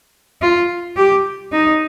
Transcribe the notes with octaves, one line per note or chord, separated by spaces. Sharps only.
F4
G4
D#4